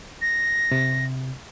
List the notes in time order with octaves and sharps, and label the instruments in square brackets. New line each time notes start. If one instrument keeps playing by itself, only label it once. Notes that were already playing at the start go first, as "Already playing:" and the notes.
[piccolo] A#6
[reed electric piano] C3